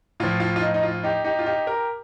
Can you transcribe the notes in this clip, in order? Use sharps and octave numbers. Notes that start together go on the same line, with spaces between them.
A2 F3 F4
F4
F4
D#4
D#4
F4
D#4 G4
D#4 G4
F4
D#4 G4
G4 A#4